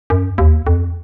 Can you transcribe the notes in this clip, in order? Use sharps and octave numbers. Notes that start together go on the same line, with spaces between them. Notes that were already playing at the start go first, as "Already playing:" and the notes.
F#2
D#2
F2